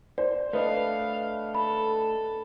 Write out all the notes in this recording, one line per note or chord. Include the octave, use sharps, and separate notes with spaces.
C5 D5
A3 D4 B4 D#5 F5
A4 B5